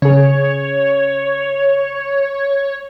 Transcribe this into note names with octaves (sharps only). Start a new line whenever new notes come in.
C#3 G#4 C#5